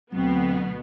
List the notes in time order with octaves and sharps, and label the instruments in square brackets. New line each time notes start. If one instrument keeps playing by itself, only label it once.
[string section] D2 B2 B3 [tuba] F#3 [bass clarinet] C4